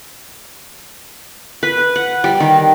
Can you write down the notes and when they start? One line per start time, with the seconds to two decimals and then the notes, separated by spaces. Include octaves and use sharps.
1.63 B4
1.96 F#5
2.24 G3
2.40 D#3